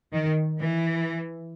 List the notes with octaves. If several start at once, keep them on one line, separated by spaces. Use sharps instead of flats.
D#3
E3